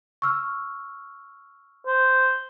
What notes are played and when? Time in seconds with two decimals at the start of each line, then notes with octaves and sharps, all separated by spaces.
0.22 C#6 E6 F6
1.87 C5